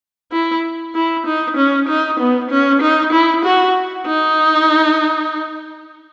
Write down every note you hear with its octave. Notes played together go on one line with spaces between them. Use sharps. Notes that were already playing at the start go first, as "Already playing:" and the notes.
E4
E4
D#4
C#4
D#4
B3
C#4
D#4
E4
F#4
D#4